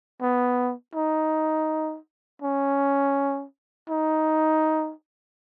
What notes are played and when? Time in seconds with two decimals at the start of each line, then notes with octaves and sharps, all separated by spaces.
0.22 B3
0.95 D#4
2.42 C#4
3.90 D#4